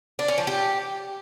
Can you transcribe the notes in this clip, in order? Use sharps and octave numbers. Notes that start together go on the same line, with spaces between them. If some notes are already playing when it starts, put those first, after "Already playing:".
D4
C#4
F3
G4